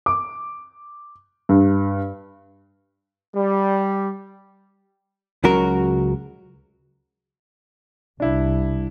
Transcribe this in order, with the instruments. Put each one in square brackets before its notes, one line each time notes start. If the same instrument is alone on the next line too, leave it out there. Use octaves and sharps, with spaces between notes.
[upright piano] D6
G2
[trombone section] G3
[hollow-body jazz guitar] C#2 C#3 F#3 F#4 A#4
[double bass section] C2 [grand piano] D4 E4